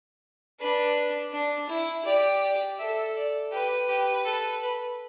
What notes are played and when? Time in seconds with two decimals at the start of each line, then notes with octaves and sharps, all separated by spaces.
0.60 D4 B4
1.33 D4
1.69 E4
2.06 G4 D5
2.43 D5
2.79 A4 E5
3.16 D5
3.52 G4 B4
3.88 G4
4.25 A4
4.62 B4